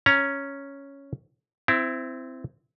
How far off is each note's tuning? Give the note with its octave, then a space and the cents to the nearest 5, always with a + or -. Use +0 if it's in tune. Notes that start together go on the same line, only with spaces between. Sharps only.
C#4 +0 A#5 +0
C4 -15 E4 +10